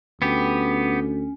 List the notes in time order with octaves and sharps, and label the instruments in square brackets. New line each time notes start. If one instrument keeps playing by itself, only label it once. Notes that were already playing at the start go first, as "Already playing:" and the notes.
[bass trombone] D2 [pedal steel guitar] B3 G4 [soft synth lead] C#4